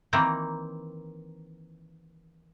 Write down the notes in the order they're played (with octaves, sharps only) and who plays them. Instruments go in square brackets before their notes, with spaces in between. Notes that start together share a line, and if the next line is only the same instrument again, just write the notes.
[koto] D#3 E3 A#3 C4